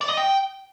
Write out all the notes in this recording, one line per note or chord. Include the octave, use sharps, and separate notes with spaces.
D5
D#5
G5